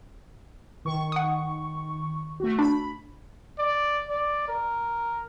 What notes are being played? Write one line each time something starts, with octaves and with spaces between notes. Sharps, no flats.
D#3 C#6
F#5 D#6
A3 F#4
D4 B5
D5
D5
A#4